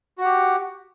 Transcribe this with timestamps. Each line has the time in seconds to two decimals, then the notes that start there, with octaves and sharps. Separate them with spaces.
0.18 F#4
0.21 F#5
0.24 G4